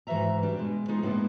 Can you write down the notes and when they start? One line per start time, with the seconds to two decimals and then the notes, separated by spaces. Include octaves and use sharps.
0.07 G#2 E3 F#4 B4 E5 A#5
0.42 G3 D4
0.57 B2 G#3
0.88 G#3 B3 D#4 F4 G#4
1.02 A2 G#3 A#3 B3 D4 E4